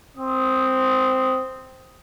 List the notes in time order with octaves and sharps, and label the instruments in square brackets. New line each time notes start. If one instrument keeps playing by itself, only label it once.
[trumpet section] C4 D#6